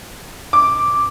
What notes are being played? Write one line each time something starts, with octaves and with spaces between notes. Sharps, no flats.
D6